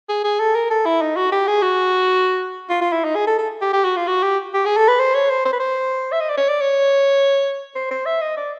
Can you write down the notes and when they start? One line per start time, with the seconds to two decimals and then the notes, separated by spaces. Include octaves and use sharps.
0.09 G#4
0.24 G#4
0.40 A4
0.55 A#4
0.70 A4
0.86 E4
1.02 D#4
1.16 F#4
1.32 G4
1.48 G#4
1.62 F#4
2.70 F4
2.81 F4
2.93 E4
3.04 D#4
3.16 G#4
3.27 A4
3.39 A4
3.62 G4
3.73 G4
3.85 F#4
3.96 F4
4.07 F#4
4.23 G4
4.54 G4
4.66 G#4
4.77 A4
4.88 B4
4.99 C5
5.15 C#5
5.30 C5
5.46 C5
5.53 B4
5.60 C5
6.12 E5
6.21 D#5
6.29 D5
6.38 C#5
6.49 D5
6.61 C#5
7.76 C5
7.91 C5
8.06 E5
8.21 D#5
8.37 D5